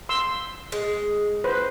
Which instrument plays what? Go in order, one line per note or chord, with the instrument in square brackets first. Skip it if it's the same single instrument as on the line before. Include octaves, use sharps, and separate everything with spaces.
[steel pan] C6 E6
[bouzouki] G#3
[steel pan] B4 C5